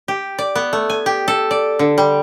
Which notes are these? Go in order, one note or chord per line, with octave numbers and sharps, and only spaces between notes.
G4
D5
B3
A3
G#5
G4
A4
D5
D3
G3